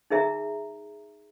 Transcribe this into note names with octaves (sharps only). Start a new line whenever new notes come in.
D#4 G#4 A#4 E5 A#5